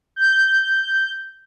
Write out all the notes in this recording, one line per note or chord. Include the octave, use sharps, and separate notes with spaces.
G6